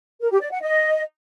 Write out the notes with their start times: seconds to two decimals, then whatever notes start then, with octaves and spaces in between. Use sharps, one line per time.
0.21 A#4
0.31 G4
0.41 D5
0.51 F#5
0.61 D#5